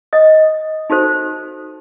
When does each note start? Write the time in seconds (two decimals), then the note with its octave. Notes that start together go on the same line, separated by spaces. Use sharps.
0.13 D#5 D#6
0.90 D#4 F#4 A4 C5